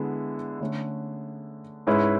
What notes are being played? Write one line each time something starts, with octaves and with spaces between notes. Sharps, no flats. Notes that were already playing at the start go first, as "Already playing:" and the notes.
Already playing: D3 G#3 B3 E4
D3 A3 C#4
G#2 G#3 C#4 E4 B4